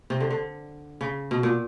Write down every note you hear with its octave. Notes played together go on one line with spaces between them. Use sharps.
C3
D3
D3
C#3
B2
A#2